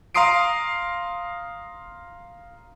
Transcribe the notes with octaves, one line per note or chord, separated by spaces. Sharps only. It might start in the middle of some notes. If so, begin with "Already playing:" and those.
F5 A#5 C6 D#6 C7 D7